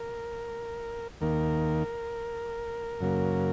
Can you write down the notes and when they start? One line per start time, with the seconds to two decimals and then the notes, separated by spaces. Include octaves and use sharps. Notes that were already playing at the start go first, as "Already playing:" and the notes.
Already playing: A#4
1.21 D#2 D#3 A#3 A#4
3.00 F#2 C#3 F#3 A#3